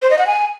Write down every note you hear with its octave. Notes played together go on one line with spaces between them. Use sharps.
C5
D#5
F#5
G#5